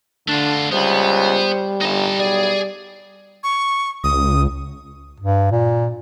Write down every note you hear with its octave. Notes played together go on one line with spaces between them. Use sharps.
D3 A3 D4 F4
C#2 G3 B3 C5
G1 D#4 A5
B1 G#4 D5
C#6
C#2 D#6
G2
A#2